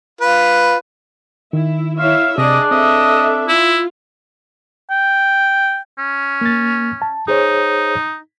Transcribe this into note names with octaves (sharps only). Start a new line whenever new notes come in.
F4 B4
D#3 E4
E4 C#5 E5 F5
C3 D4 G#4 D5 D#5
C4 A4 D#5 E5 D#6
E4 F4
G5
C#4
A#3 A6
A5
D#4 G#4 C5 C#5